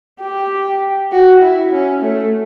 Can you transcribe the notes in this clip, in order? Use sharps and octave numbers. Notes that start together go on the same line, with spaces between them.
G4
F#4
E4
C#4
A3